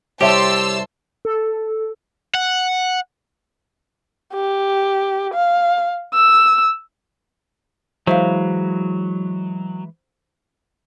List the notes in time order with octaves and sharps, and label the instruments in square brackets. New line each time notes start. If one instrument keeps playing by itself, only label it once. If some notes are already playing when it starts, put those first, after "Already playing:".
[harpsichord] C2 [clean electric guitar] G4 [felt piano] C#5 E5 [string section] A5 C6 E6
[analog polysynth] A4
[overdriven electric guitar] F#5
[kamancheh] G4
F5
E6
[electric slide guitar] E3 G#3 E4 [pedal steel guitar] F#3 [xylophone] C5 E5 F5